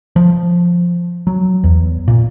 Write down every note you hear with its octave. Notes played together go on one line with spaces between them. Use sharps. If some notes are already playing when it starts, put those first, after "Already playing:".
F3
F#3
E2
A#2